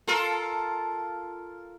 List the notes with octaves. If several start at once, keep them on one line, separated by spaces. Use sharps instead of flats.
F4 A4 A#4